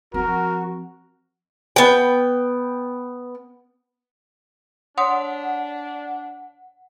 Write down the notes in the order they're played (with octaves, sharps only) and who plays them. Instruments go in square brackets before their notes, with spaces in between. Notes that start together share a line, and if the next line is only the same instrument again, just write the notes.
[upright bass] F3 C4 [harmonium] F#4 [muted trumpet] A#4
[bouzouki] B3 G5
[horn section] D4 [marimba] C#5 C6 D#6 [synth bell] F#5